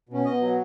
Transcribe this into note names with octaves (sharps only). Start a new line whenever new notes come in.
B2 C#4
B2 D#5
F#3